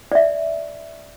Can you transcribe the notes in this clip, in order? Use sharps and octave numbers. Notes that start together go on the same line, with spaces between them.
D5 E5